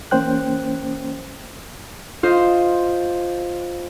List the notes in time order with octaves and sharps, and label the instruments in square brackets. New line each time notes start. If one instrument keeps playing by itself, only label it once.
[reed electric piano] E3 A#3 C#4 C5 G5 F#6
[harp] F4 C5 D#5